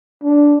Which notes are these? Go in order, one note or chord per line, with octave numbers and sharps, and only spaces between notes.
D4